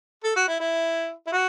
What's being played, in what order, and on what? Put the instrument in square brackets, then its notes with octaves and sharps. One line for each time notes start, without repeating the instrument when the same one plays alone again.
[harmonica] A4
F#4
E4
E4
E4
F#4